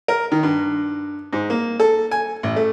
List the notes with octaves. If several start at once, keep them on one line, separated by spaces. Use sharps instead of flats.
A#4
D#3
G2
G#2
A#3
A4
G#5
A1
A3